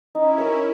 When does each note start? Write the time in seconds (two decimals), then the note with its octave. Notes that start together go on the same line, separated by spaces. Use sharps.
0.15 C#4 D#4 E4
0.38 A#4 C#5